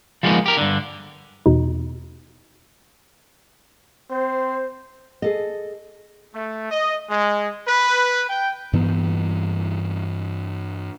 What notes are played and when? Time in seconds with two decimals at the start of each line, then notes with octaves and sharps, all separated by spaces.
0.23 F3 G3 G#3 A#3 B3 D#4
0.46 G4 A#4
0.57 G2 D3
1.46 E2 B2 D#4
4.10 C4 C5
5.22 G#4 A4 D#5
6.32 A3
6.69 D#5
7.09 G#3
7.66 B4
8.28 G5
8.73 G2 E3 B3